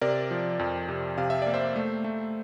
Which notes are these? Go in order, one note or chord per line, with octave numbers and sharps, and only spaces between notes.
C3 A#4 D5
F3
F2
C3
C3 F5
E5
A#3 D5
C5 E5
A3
A3